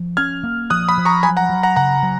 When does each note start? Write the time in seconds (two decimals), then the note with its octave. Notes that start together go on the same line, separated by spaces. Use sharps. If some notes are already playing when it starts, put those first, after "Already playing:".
Already playing: F3
0.17 C#4 F6 G#6
0.44 A#3
0.70 F3 D#6 F#6
0.88 B5 D#6
0.97 F3
1.05 A#5 C#6
1.23 F#3 G#5 B5
1.37 F#5 A#5
1.49 F#3
1.63 F#5 A#5
1.76 C#3 F#5 A#5
2.03 F#3